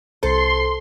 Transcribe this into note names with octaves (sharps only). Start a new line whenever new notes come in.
C2 A4 C5 C6